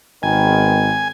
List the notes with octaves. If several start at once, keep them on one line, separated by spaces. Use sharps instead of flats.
G#1 D#3 G#3 B3 G#5